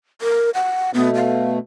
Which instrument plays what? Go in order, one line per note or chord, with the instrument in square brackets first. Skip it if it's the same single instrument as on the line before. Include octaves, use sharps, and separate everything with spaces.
[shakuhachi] A#4
F#5
[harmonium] B2 A3 [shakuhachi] B3
[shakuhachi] F5